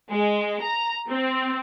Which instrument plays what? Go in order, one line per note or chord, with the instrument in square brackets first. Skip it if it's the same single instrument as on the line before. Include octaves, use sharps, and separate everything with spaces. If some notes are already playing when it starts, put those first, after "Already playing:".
[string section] G#3
A#5
C4